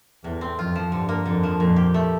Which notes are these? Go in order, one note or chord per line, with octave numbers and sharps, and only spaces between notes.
E2 A2
C4
F2 F4
F3
G2 D3
A#3
F2 D3
F3
F2 A#2
G4
A3